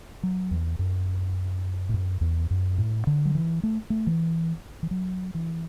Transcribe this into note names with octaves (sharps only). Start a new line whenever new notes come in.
F#3
E2
F#2
A2
F#2
E2
F#2
A2
D3
F#3
E3
A3
A3
E3
E3
F#3
E3